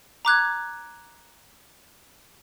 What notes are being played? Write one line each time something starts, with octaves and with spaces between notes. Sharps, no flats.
A#5 D6 F#6 G#6